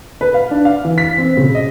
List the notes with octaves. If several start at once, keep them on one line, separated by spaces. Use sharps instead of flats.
B4
F5
D4
F5
E3
B6
C4
C#3
D#5